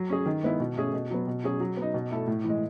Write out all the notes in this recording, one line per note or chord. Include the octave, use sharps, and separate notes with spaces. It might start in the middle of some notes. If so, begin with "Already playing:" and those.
Already playing: F#3
C#4 G#4
D#3
G#3 B3 E4
B2
A3 C#4 G#4
B2
F#3 B3
B2
F#3 C#4 G#4
F#3
B3 D#4
B2
A3 E4 A4
A2
E3
G#3